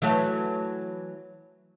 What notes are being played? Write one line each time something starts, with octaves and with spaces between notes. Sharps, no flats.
E3 F#3 A3